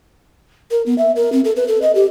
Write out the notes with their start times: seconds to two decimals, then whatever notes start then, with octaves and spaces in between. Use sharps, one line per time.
0.71 A#4
0.86 B3
0.98 E5
1.16 A#4
1.32 C4
1.45 A4
1.56 B4
1.68 A4
1.82 D#5
1.95 G4